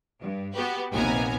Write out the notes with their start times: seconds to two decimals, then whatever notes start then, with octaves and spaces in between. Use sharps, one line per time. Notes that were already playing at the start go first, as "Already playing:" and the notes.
0.21 G2
0.54 B3 F#4 G4 B4
0.91 A#1 D#2 C3 B3 G#5 A#5